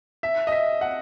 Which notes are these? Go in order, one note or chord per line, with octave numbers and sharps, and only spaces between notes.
E5
D#5
E5
F#5